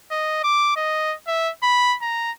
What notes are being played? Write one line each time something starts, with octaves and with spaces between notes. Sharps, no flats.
D#5
D6
D#5
E5
B5
A#5